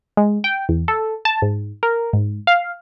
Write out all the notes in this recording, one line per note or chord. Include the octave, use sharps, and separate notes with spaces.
G#3
G5
E2
A4
A5
G#2
A#4
G#2
F5